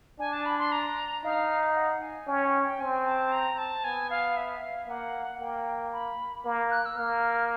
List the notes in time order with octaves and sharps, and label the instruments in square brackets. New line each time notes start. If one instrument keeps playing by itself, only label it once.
[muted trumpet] D4 [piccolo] G#5
[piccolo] A5
B5
C6
A#5
[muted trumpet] D#4 [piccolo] F5
[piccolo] F#5
G#5
[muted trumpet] C#4 [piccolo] G5
[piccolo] G5
G5
[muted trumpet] C4 [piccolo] G#5
[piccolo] A5
A#5
A5
[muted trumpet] B3 [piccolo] G#5
[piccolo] F5
E5
F5
[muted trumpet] A#3 [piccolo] F#5
[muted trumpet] A#3 [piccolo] G5
[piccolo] B5
[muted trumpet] A#3
[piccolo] F#6
E6
[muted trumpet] A#3 [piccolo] F6